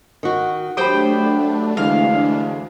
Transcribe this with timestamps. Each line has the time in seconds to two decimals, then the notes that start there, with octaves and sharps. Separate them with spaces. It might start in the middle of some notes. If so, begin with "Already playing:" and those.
0.23 D#3 F#4
0.77 F#3 A3 D4 G4 C5 G5 B5 D#6
1.77 D2 E3 G#3 F5